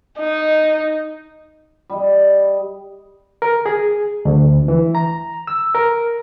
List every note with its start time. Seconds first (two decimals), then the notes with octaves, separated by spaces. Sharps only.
0.20 D#4
1.90 G3 D#5
3.42 A#4
3.66 G#4
4.25 D2
4.68 E3
4.95 A#5
5.47 E6
5.75 A#4